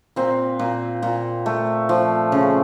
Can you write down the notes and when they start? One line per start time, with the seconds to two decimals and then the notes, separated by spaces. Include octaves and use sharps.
0.16 A#2 C4
0.59 A#2
1.02 A#2
1.46 A3
1.89 F3
2.32 C#3